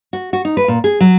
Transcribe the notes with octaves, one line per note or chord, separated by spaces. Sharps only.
F#4
F#4
D#4
B4
A#2
G#4
F#3